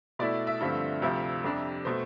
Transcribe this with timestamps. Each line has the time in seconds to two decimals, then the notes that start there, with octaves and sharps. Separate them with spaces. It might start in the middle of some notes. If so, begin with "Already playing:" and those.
0.19 B2 A3 E4 D5
0.47 E5
0.60 G2 D3 F3 A3 C4
1.02 D2 C3 F3 E5
1.44 F2 C3 G3 D4
1.85 B2 A3 C5